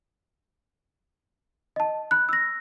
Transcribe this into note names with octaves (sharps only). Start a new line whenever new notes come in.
D#5 A5
B5 F#6
E6 A#6